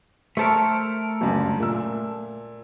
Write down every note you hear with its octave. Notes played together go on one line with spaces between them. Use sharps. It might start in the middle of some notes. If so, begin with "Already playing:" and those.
A3 A4 A#4 C5 C#6
G1 C#2 F#2
A#2 E6